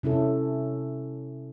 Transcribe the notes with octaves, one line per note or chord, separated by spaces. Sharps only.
C3 C#4 E4 A4